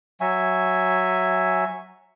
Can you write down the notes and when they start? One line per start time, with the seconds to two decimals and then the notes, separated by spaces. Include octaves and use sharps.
0.21 F#3 E5 G#5